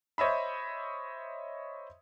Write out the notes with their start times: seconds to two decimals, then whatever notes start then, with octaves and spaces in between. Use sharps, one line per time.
0.18 C5 C#5 D#5 E5 B5